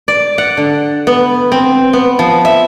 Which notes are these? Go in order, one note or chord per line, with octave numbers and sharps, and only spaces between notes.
D5
F#5
D3
B3
C4
B3
F3
E5